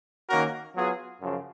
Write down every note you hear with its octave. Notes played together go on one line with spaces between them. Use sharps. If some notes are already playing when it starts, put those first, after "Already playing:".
D#3 A#3 C#4 F#4 A#4
F#3 B3 F4 G#4
F#2 C#3 F3